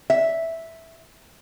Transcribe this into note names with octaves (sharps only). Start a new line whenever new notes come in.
E5